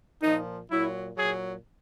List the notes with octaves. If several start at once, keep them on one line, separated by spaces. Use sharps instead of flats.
A#2 F3 D#4
A#2 F#3 E4
A#2 F#3 G#4